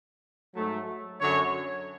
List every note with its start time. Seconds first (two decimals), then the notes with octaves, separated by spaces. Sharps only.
0.55 G#2 F#3 A3
1.21 F#2 D3 F#3 C#5